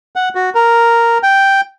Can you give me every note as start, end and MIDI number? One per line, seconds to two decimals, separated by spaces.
0.16 0.29 78
0.35 0.50 66
0.55 1.18 70
1.23 1.61 79